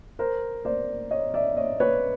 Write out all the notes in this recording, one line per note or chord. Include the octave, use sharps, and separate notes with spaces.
A#4 C5
C5 D5
C#5 D#5
D5 E5
C#5 D#5
B4 C#5